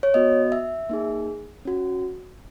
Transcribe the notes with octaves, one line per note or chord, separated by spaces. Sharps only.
C#5
B3 F#4 D#5
E5
A#3 D#4 G#4
C#4 F#4